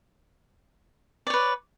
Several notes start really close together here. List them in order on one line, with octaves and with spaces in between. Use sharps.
D5 C#5 B4